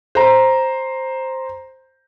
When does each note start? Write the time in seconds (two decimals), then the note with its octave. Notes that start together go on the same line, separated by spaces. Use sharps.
0.15 C5 A#5